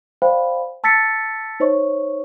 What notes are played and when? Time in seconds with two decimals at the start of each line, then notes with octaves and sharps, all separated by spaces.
0.22 C5 D5 F5 G5 B5
0.84 A5 E6 A6 B6 C#7
1.60 D#4 C5 C#5 D#5 C#6